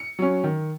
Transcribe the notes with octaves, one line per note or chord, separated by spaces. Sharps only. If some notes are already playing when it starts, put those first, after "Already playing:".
Already playing: C#7
F#3 C#4
D#3